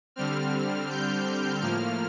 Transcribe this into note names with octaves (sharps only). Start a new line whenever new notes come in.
D3 G3 C4 F6
G6
A2 F3 A#3 F6